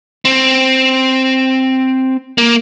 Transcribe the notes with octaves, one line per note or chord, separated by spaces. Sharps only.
C4
A#3